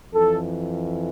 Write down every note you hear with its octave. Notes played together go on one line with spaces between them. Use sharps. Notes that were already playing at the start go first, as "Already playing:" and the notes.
F2 E3 A4